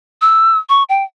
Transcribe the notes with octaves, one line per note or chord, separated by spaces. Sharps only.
E6
C#6
G5